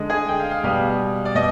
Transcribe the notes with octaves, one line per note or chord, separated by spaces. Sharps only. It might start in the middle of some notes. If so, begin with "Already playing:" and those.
Already playing: D3 G#3
G#4
G5
F5
F5
B2 G3 F5
D5
B2 D#5